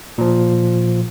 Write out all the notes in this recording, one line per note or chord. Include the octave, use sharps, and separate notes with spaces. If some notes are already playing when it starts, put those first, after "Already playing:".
A#2 F3